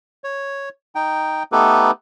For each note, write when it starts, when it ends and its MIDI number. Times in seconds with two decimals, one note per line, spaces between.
0.24 0.69 73
0.95 1.43 63
0.95 1.43 79
1.52 1.91 57
1.52 1.91 59
1.52 1.91 63
1.52 1.91 67
1.52 1.91 69
1.52 1.91 71